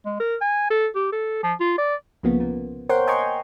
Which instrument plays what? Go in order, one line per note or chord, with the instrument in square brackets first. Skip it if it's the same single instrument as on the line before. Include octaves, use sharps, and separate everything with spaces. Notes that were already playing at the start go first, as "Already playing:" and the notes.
[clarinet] G#3
A#4
G#5
A4
G4
A4
F3
F4
D5
[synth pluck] C2 C#3 F3 A#3 B3
A#2
A#4 C5 C#5 F#5 G5 C6
D#5 G5 G#5 A#5 C6 C#6